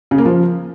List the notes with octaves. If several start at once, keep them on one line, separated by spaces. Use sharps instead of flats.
C#3
A#3
F3